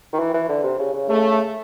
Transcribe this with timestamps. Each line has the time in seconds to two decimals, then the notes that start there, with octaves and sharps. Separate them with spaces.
0.13 D#3
0.19 E3
0.34 E3
0.49 D3
0.63 C3
0.79 C#3
0.94 C#3
1.09 C#3 A3